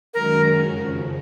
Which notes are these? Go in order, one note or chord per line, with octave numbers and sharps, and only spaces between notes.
F#2 D#3 G#3 C#4 F#4 A#4
F2 C#3 F3